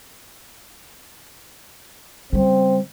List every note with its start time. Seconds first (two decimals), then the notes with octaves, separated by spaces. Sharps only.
2.33 C#3 G3 C4